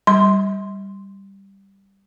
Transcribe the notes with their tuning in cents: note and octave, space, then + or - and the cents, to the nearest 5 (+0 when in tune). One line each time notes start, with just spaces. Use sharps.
G3 +0 C6 +0